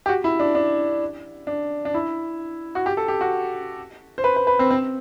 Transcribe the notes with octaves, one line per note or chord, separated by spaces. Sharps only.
G4
F#4
E4
D4
D4
D4
D4
E4
F#4
G4
A4
G4
F#4
C5
B4
B4
B4
C4
C4